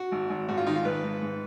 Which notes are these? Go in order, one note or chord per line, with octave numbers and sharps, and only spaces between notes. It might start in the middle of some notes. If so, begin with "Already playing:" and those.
Already playing: F#4
G#1
G#1
G#2 F#4
F4
D#3 D#4
F4
G#1 B4
G#2
G#2